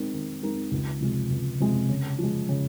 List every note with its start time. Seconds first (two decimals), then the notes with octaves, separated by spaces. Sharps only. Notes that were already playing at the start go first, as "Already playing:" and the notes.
Already playing: D#3 G#3 C4 D#4 A#4
0.14 D#3
0.43 G#3 C4 D#4 A#4
0.72 C#2
1.01 C3 F3 G#3
1.30 C#2
1.60 C3 F3 G#3
1.89 C#3
2.19 F3 G#3
2.49 C#3